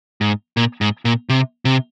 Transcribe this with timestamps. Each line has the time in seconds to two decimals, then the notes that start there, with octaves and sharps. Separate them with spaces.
0.21 G#2
0.57 A#2
0.81 G#2
1.05 A#2
1.29 C3
1.65 C3